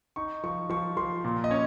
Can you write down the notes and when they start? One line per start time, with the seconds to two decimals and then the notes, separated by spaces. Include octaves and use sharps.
0.16 D#4 C#6
0.43 F3 C#6
0.69 F3 C#6
0.97 F3 C6
1.24 A#2
1.44 D#5
1.51 C#4 C#5